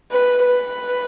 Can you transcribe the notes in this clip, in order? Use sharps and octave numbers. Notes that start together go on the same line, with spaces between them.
B4
B4